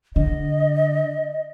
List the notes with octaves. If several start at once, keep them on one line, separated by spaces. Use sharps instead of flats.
D3 D#5